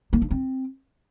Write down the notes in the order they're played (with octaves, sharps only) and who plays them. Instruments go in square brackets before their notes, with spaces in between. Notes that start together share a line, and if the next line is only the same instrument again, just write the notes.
[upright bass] A#3
D4
C4